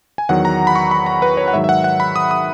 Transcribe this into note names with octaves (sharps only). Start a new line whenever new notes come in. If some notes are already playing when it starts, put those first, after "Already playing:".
G#5
E2 D#3 F#3 F#5
A#5
B5
C#6
B5
A#5
B4
C#5
F#5
G#2 D#3 F#3 E5
E5
F#5
F#5
B5
D#6
D#6